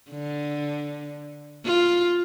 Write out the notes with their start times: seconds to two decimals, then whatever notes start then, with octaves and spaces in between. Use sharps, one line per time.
0.11 D3
1.65 F4